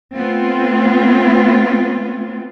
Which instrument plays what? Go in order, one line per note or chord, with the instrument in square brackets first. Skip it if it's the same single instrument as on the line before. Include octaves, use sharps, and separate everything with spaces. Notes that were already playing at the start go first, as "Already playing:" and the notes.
[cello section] A3 B3 C4 F4